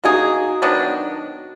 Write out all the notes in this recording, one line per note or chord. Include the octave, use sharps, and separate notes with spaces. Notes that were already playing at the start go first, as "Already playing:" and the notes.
A#3 D#4 F#4 G#4
D#3 F#3 B3 D4